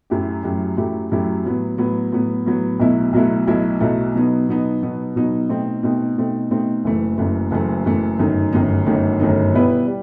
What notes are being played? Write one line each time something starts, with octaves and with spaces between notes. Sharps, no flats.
F#2 F#3 A3 E4 G4
F#2 F#3 A3 E4 G4
F#2 F#3 A3 E4 G4
F#2 F#3 A3 E4 G4
A2 F#3 B3
A2 F#3 B3
A2 F#3 B3
A2 F#3 B3
B1 B2 F#3 A3 E4
B1 B2 F#3 A3 E4
B1 B2 F#3 A3 E4
B1 B2 F#3 A3 E4
B2 F#3 B3 D#4
B2 F#3 B3 D#4
B2 F#3 B3 D#4
B2 F#3 B3 D#4
B2 A3 C4 D#4
B2 A3 C4 D#4
B2 A3 C4 D#4
B2 A3 C4 D#4
F#1 F#2 E3 A3
F#1 F#2 E3 A3
F#1 F#2 E3 A3
F#1 F#2 E3 A3
G1 F#2 D#3 A3 D#4
G1 F#2 D#3 A3 D#4
G1 F#2 D#3 A3 D#4
G1 F#2 D#3 A3 D#4
B2 G3 B3 E4 B4
G3